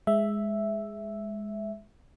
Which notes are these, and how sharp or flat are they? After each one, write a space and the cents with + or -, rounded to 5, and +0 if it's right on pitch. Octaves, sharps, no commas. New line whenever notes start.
G#3 +0 E5 +0